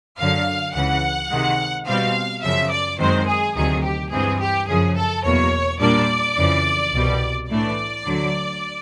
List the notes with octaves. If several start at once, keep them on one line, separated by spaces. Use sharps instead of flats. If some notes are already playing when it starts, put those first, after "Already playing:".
F#2 D3 F#3 F5
C#2 C#3 E3 F#5
C3 D#3 G#3
B2 G3 C4 F5
F#2 C#3 F3 E5
D5
F#2 D#3 G#3 C4 C5
G#4
D2 C3 D#3 F#3 G#4
G4
G2 E3 G#3 C4 G#4
G4
F#2 C#3 F3 G#4
A4
E2 B2 F#3 A#3 C#5
A#2 G3 A#3 D4 D5
F2 C#3 E3
C2 B2 G3
A2 E3 A3 D4 D5
D2 D3 F#3